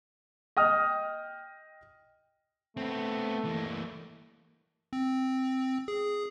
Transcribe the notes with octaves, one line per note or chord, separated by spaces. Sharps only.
D#5 G5 D#6 F6
A3 B3 C4
E3 A#3
C4
G#4